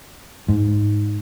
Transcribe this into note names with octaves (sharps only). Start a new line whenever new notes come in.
G#2